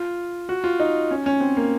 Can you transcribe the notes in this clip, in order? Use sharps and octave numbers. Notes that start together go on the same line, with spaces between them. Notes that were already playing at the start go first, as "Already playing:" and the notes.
Already playing: F4
F#4
F4
D#4
C#4
C#4
C4
A#3